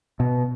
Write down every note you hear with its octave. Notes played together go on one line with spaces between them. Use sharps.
B2